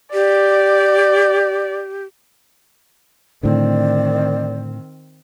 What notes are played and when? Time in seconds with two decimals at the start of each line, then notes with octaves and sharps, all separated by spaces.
0.14 G4 D5
3.43 A2 D3 D#3 C4 D5